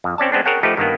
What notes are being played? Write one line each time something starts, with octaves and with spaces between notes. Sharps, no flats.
F2
C4 C#4 D5 A5
G#3 B3 C4 D4
G#4 A#4 C#5 F#5 G5 A5
F3 A3 D#4 G4 B4
G2 D#3 A#3 B3